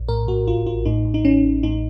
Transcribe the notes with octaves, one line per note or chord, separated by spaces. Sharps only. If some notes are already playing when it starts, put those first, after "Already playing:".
Already playing: A#1
A2 A#4
A2 F#4
A1 F4
A1 F4
A2 D#4
A2
D#4
A1 C#4
A1
A2 D#4